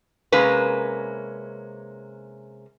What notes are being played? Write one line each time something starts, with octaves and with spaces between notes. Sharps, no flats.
C3 G#3 A#3 C#4 B4